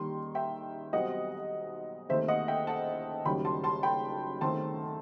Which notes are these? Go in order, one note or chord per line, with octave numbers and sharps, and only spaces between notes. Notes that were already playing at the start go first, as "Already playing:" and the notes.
Already playing: D#2 D#3 G3 C6
E5 G5
B1 B2 G3 C4 D#5 F#5
D#2 D#3 A3 C4 C5 E5
D#5 F#5
E5 G5
F#5 A5
F#1 F#2 D#3 G3 G5 B5
A5 C6
A5 C6
G5 B5
E2 D#3 A3 C4 A5 C6